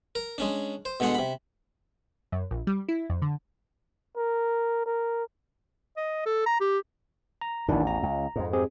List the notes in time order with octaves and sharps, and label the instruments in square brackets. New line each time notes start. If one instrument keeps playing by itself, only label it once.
[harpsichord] A#4
G#3 C#4 D4
C5
B2 D3 G#3 F#5 C6
C3 B5
[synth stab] F#2
A#1
G3
E4
F2
D3
[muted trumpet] A#4
A#4
[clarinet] D#5
A4
A#5
G4
[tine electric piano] A#5
[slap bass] A1 E2 [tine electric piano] D#3 D4 E4
[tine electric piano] A#5
[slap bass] C#2
F2 G#2
[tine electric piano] C4 G4 G#4